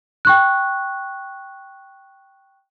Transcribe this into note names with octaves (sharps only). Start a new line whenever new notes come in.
G5 C#6 F#6